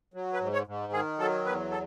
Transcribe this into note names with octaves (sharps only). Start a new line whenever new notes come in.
F#3
B4
G#2
C#5
G#2
D#3 G#4
F#3 A4
E2 B4
A4